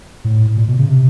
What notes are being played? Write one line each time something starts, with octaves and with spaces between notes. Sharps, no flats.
A2
A#2
B2
C#3
C3